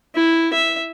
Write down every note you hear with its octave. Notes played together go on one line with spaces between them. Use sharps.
E4
E5